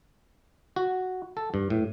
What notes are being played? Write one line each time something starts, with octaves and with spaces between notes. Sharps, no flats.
F#4
A4
G2
A2